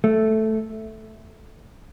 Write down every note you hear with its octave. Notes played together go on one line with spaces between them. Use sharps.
A3